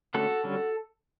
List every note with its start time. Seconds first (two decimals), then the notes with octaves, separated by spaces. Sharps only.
0.14 D3 A3 C#4 F#4 A4
0.44 D3 G3 C#4